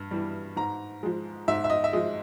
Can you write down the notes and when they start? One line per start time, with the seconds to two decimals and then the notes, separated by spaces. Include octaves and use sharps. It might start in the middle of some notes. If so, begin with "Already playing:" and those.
Already playing: G2
0.11 E3 G3
0.56 G#2 A#5
1.03 F3 G#3
1.48 G#2 E5
1.64 E5
1.70 D#5
1.84 E5
1.93 F3 G#3 D#5